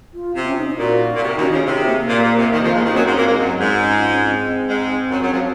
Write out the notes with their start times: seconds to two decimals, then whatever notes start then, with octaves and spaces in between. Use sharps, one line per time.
0.14 F4
0.36 C3 F4
0.42 C4
0.47 C#4
0.58 D#4
0.69 D#4
0.79 A#2 F#4
1.16 A#2
1.22 C3
1.37 D#2 D#3 C#4
1.50 C#3 D#4
1.58 F4
1.66 C3 F#4
1.76 G#4
1.87 A#3
1.98 A#3
2.09 A#2
2.23 A#2
2.38 C3
2.52 D#2 D#3
2.62 F2 F3
2.73 G#2 G#3
2.85 D#2 D#3
2.94 F#2 F#3 C4
3.06 G#2 G#3
3.16 A#2 A#3
3.27 G#2 G#3
3.38 F#2 F#3
3.60 G#2 G#3
3.82 C#4
3.95 F4
4.10 C#4
4.24 C4
4.68 G#2 G#3
5.11 F#2 F#3
5.22 F#2 F#3
5.32 F3